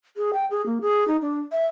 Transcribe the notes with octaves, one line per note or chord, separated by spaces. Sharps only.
G#4
G5
G#4
A#3
G#4
D#4
D4
E5